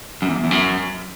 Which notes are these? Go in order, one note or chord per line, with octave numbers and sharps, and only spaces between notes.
F#2
E2
E2
F#2